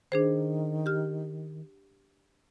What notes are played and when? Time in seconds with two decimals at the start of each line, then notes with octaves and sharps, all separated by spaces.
0.12 D#3 D4 G#4 C5
0.86 G4 F6